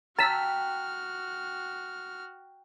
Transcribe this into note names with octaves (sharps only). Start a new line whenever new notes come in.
F#4 G5 A5 A#5 E6 F6 B6